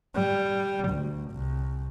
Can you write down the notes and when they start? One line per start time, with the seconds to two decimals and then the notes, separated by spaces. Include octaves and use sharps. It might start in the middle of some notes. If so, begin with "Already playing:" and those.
0.15 G3
0.89 D2
1.32 C2